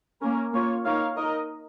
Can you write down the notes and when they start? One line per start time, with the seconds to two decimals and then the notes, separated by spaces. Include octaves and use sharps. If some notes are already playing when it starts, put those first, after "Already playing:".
0.22 A#3 C#4 A#4
0.53 A#3 F4 C#5
0.85 A#3 D#4 A#4 C#5 F5
1.17 D#4 A#4 D#5